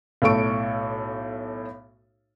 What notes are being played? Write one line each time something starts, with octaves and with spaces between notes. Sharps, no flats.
B1 A2 A4 C#6 D7